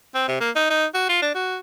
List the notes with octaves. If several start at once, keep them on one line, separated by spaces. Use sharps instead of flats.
C4
C3
A#3
D#4
D#4
F#4
F4
D4
F#4